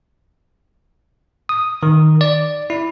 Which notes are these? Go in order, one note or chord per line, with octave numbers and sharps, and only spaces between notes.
D#6
D#3
D5
E4